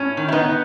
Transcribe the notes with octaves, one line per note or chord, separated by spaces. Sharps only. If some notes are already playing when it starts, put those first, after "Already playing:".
Already playing: A2 C#4
D#3
E4
B3 D#4